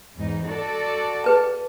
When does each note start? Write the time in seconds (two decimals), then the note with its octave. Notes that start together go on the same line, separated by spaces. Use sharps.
0.16 E2 G#2 D#4
0.47 F#4 A4 D5
1.24 G#4 B4 A5